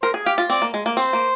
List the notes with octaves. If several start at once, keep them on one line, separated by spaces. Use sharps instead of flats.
A#4 C5
G#4
G4 F5
F4
C4 D5
A#3
G#3
A#3
C4 C5
A#3